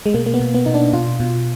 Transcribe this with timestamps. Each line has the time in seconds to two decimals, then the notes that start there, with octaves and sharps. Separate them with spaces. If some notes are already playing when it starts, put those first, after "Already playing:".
0.06 G#3
0.14 B2 A#3
0.26 A#3
0.34 B3
0.40 B2
0.54 B3
0.66 B2 D#4
0.74 D4
0.93 B2 F4
1.20 B2